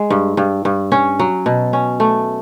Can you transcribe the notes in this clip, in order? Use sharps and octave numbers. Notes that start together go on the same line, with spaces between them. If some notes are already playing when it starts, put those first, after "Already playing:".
Already playing: G#3
G2
G2
G2
C#4
F#3
B2
C#4
A3